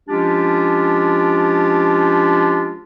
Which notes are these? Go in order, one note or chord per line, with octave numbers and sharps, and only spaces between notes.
F3 G#3 C#4 D4 F4 G4